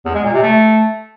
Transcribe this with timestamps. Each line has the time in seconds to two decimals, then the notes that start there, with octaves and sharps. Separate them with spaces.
0.06 E2
0.15 G#3
0.24 A#2
0.33 C3
0.42 A3